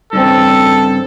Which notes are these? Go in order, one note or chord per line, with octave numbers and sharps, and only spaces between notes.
G2 C#3 C4 A4